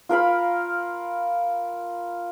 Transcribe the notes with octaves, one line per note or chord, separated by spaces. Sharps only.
F4 A#4 F5 B5